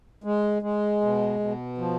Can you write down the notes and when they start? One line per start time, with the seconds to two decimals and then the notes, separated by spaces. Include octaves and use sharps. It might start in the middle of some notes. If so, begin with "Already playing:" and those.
0.24 G#3
0.62 G#3
1.01 B2
1.40 B2
1.78 F3